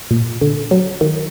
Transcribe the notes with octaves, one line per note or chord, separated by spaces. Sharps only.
A#2
D3
F#3
D#3